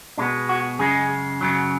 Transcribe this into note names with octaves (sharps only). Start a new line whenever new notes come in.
B2 G#3 B3 D4
F#4
F#2 C#3 G#3 G#4
F#2 C#3 F#3